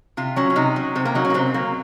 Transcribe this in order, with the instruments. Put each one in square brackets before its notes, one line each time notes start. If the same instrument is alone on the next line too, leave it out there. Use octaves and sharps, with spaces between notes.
[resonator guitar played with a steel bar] C3 F4
F#3 C#4
C#4
C3 D#4
F#3
C3 C4
A#3
F#3 D#4
C#4
A#3
C3 C4
F#3 A#3